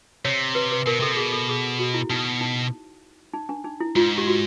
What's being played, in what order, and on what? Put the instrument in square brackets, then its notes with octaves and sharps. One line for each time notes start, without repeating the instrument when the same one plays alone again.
[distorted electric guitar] C3 [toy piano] C#5
[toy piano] B4
B4
[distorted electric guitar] B2 [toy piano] A#4
[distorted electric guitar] C3 [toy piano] A4
[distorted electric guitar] B2 [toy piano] G#4
[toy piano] A4
G#4
F#4
E4
[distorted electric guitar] B2 [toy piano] D#4
[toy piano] D#4
D#4
D4
D#4
E4
[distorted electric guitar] G#2 [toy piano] F4
[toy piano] G4
F#4